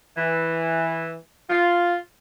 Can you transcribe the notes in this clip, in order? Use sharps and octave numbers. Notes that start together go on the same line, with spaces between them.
E3
F4